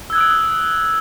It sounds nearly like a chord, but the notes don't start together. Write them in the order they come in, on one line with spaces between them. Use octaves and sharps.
E6 G#6 F#6 D#6 D7